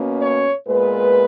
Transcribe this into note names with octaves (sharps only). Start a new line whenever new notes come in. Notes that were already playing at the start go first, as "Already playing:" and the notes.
Already playing: B2 A#3 C#4
C#5
A#2 G#3 B3 B4